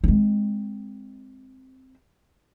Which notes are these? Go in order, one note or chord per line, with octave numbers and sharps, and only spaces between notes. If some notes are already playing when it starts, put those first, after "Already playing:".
G#3 C4